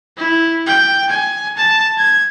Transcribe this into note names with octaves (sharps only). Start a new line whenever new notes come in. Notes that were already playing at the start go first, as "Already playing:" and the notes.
E4
G5
G#5
A5
G#6